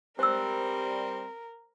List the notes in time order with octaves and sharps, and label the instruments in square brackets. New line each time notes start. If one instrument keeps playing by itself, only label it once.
[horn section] G3 [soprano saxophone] C4 [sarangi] A#4 [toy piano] C5 E6